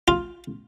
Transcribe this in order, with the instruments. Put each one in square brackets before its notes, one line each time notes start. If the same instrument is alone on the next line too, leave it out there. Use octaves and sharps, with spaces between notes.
[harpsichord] F4